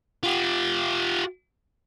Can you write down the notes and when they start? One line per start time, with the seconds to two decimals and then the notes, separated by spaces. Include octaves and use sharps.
0.24 F4 G4